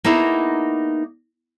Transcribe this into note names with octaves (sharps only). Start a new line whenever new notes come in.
A#3 B3 D#4 E4 G#4